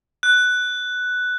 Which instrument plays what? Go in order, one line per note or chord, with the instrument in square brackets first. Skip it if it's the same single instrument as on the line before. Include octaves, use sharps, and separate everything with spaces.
[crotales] F#6